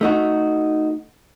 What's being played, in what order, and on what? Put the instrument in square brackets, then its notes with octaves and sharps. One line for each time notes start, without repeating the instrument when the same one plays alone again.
[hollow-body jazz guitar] A3 D#4 F#4